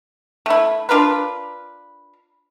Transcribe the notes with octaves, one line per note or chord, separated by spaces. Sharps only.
A3 E4
D4 F4 A#4 B4